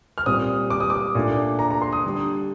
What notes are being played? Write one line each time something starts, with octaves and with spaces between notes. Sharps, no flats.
F6
A#2 G3 C4 D#6
D6
D#6
D6
A#2 A3 D4
A#5
A#5
C6
D#6
D3 G3 D4